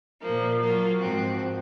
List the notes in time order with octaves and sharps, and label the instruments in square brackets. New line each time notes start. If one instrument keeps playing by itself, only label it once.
[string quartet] A#2 F3 A#3
F#3 A#3 F4
G#2 F3 C4 F#4